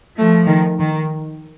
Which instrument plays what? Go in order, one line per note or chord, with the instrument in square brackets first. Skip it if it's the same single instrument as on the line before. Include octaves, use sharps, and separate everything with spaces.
[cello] F3 [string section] A3
[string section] D#3
D#3